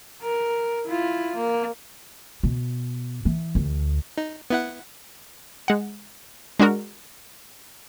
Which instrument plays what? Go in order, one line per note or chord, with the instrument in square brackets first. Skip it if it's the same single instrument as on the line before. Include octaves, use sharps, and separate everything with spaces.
[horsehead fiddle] A#4
E4 F4
A#3
[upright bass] B2
E3
D2
[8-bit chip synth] D#4
B3 E4 F#5
[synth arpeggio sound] G#3 F#5
G#3 D4 F#4 A#4